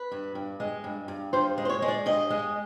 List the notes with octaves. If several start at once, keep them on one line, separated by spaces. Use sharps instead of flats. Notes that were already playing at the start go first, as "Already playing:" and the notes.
Already playing: B4
G2
G2
G#3
G2
G2
G2 C5
G#3
C5
C#5
G#3
D5
G2 D#5
G#3